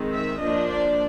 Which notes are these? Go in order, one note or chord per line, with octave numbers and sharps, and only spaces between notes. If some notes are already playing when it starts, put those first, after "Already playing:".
Already playing: D#3 G#3 C4
E5
F3 A#3 D4 D#5
D5